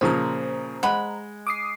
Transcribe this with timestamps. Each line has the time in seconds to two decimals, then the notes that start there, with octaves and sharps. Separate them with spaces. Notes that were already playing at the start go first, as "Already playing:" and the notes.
0.01 A#2 C#3 F3 C5 A#5
0.83 G#3 F#5 B5
1.47 D6 D#6 C7